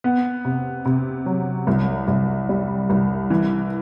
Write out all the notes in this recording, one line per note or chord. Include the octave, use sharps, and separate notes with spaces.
B3
C3
C3
F#3
C2
C2
G3
C2
E3